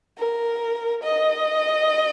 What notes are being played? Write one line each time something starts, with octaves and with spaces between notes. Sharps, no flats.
A#4
D#5